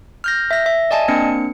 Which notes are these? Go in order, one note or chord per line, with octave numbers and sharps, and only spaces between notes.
F6 G6 A#6
E5 A#6
E5
D5 D#5 G#5 A5
A#3 C4 D4 C#7